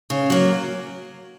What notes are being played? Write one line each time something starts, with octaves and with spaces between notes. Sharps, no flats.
C#3
F#3 A#3